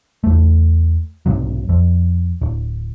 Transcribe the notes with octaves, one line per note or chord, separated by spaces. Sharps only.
E2 A3
B1 G#2 C3 F#3
F2
D1